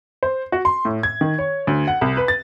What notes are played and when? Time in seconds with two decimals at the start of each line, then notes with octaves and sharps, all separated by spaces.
0.23 C5
0.52 F#4
0.65 C6
0.85 A2
1.03 G#6
1.21 D#3
1.39 C#5
1.67 D2
1.87 F#5
2.01 C2
2.17 B4
2.28 A6